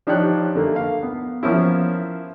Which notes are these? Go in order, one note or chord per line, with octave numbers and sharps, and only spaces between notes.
F3 D4 D#4 G4 C#5 F#6
D3 A3 A#3
F5
B3
F3 A#3 B3 C#4 E4